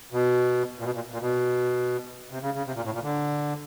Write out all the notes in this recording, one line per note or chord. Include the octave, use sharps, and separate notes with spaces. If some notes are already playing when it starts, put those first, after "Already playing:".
B2
A#2
B2
A#2
A#2
B2
C3
C#3
C#3
C3
A#2
A2
A#2
D3